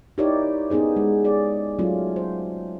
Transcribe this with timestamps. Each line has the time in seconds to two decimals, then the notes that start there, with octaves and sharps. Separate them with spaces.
0.18 D#4 E4 G4 A#4 C#5 D5
0.70 B3 C#4 D#4 G#4 C5
0.96 G#3
1.24 G#4 D5
1.79 F#3 A3 C#4 F4
2.16 C5